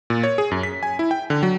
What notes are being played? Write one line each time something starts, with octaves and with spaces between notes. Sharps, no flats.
A#2
C#5
G#4
F#2
B6
G#5
E4
G5
D3
F#3